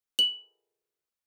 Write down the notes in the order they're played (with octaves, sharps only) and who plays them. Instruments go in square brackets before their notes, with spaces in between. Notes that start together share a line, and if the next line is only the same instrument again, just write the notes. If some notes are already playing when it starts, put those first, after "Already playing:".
[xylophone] F#7